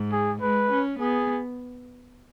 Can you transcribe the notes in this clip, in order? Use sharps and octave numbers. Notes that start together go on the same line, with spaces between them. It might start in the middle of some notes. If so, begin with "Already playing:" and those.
Already playing: G#2
G#4
G#3 B4
C#4
B3 G#4